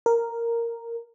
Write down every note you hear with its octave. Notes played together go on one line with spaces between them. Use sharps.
A#4